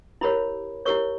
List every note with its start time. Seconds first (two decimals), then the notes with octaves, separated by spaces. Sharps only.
0.21 E4 G4 A#4 C#5 B5
0.85 E4 G4 A#4 C#5 C#6